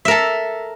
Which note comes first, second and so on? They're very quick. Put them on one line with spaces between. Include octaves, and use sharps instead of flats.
E5 A#4 A4